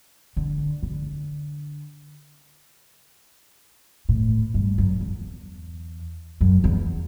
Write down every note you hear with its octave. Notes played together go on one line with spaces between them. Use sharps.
D3
D3
A2
G2
F#2
E2
F#2
E2